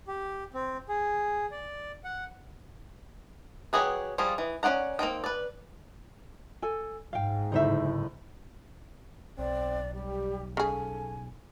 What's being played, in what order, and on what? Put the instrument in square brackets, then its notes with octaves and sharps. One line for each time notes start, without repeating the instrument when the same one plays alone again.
[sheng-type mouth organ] G4
C4
G#4
D5
F#5
[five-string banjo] F#3 G4 G#4 B4
F3 G3 F4 G#4
E3
C#4 F4 D5 F#5 A#5
A#3 C4 D#4 G5
B4 D5
[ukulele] A4 G#5
[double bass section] G#2 [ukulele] F5 G5
[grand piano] F#1 D2 A2 [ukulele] D#4 C5 E5
[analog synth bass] B1 [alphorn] C4 [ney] D5
[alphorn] G3 [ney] G4
[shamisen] C#3 G#4 [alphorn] A4 [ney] G#5